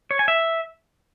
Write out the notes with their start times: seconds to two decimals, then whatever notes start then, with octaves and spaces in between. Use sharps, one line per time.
0.11 C#5
0.19 G#5
0.28 E5